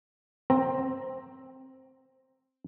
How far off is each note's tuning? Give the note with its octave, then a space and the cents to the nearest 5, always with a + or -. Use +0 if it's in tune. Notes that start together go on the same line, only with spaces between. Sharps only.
C4 +5 A#5 +0